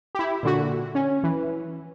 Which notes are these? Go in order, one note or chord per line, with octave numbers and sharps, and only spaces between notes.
E4 G4
A#2 D3 F#4
C#4
E3